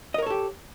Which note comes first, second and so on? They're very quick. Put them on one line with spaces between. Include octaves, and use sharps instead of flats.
D#5 A#4 C#5 A4 G4